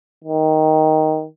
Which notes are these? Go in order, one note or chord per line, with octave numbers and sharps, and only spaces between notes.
D#3